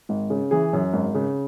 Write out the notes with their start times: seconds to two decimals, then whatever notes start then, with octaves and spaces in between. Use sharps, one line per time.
0.09 G#1
0.30 C#3
0.51 E3 G#4
0.73 F#2
0.93 G#1
1.14 C#3